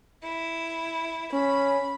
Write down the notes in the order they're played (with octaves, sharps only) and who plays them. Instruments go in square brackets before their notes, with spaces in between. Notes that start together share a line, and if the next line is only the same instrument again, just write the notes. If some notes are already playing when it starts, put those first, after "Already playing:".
[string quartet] E4
[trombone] C#4 [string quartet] B5